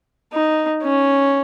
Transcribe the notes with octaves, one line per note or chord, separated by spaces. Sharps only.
D#4
C#4